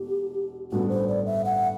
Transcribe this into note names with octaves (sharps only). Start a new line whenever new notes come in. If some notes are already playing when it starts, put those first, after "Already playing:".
Already playing: E1 E2 B2 A3 G4
A1 G2 D3 G3 B3 F#4
C5
D5
E5
F#5